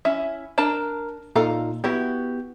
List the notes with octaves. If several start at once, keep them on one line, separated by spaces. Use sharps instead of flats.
C#4 E4 E5
D4 A#4 A5 A#5
A#2 D#4 A4 F5 A#5
B3 E4 F#4 G4